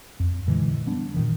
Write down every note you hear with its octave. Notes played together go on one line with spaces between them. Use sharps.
F2
A#2 D3 E3 G#3
G3 B3 D4
A#2 D#3 E3